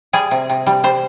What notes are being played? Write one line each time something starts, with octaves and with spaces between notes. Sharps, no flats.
G3 G#4
C3
C3
G3
G3 C5